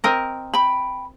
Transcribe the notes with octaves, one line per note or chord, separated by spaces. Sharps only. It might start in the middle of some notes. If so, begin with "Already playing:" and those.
C4 A#4 D#5
G5 B5